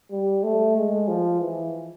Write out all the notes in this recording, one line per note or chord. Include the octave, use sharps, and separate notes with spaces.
G3
A3
G#3
F3
E3